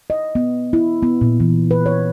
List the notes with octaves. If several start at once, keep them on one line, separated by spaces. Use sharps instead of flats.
D#5
B3
E4
B3
A#2
E3
B4
C#5